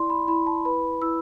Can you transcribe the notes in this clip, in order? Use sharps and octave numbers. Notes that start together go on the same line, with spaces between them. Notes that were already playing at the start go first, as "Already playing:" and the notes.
Already playing: E4 D5 C6
B5
E4 B5
A5
B4 B5
E4 E6